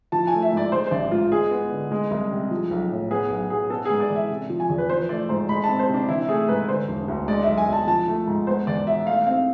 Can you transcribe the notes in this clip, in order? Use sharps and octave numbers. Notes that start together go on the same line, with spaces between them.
F3 A5
G#5
A3
E5
G#2 D5
G#3 C5
C5
A1 D5
G#2 F4
G#3 G#4
B3
D3
G#3
C2
C3
F3
B1
A2
B3 G#4
B1
B2 G#4
B3 A4
G#2 G#4
D5
E3
E5
C3
F3
G#5
E2
B4
F3 C5
A3 D5
G#2 C5
G#3 B5
A5
C4
C5
C3
D4
E3 E4
A3 G#4
G#2 B4
D3 C5
E1
D2
G#3 D5
B1 E5
G#5
B2 A5
F3 A5
A3
G#2
B3 C5
E2 D5
B2 E5
A3 F5
C4 F5